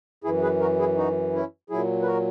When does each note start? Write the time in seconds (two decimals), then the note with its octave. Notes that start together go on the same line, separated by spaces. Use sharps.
0.24 F#2 E3 E4 G#4
0.42 G#4 B4
0.61 F#4 A#4
0.79 E4 G#4
0.97 D#4 F#4
1.33 C#4 E4
1.70 A#2 F#3 E4 G#4
2.02 B4
2.07 F#4 A#4